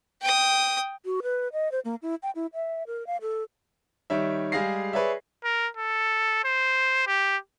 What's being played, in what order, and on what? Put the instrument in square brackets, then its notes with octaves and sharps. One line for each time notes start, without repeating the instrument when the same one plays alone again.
[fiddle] G5 D#6
[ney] F#4
B4
D#5
C5
A#3
E4
G5
E4
E5
A#4
F5
A4
[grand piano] D#3 G3 C#5 E5
G3 G#3 G#4 F5 A#6 C7
G#4 B4 C#5 D5 E5
[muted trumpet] A#4
A4
C5
G4